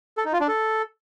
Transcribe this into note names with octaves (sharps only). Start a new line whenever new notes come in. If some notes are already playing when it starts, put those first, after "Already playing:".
A4
D#4
F4
D4
A4